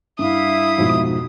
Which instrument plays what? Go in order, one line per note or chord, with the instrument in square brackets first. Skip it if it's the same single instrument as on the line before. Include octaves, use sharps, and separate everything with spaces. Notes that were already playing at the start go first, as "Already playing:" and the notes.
[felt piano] G2 [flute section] E4 E5 F5 [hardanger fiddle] D#6
[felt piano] F2 G#2 B2